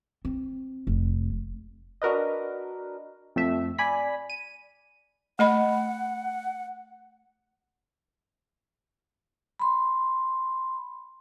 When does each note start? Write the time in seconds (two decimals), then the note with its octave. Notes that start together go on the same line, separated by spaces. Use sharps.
0.25 C4
0.87 F1
2.02 D4 F#4 A#4 B4 D#5
3.36 F2 A3 E5
3.78 D5 G#5 B5 B6
4.30 D#7
5.39 A3 D#5 F#5 B5
9.59 B5 C6